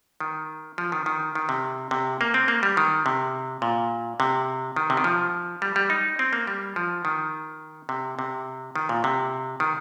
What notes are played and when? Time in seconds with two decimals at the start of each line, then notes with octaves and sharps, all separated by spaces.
0.20 D#3
0.78 F3
0.92 D#3
1.06 D#3
1.35 D#3
1.49 C3
1.91 C3
2.21 A#3
2.34 C4
2.48 A#3
2.63 G3
2.77 D#3
3.06 C3
3.62 A#2
4.20 C3
4.76 D#3
4.90 C3
4.97 D#3
5.04 F3
5.62 G3
5.76 G3
5.90 D#4
6.19 C4
6.33 A#3
6.47 G3
6.76 F3
7.05 D#3
7.89 C3
8.19 C3
8.76 D#3
8.89 A#2
9.04 C3
9.60 D#3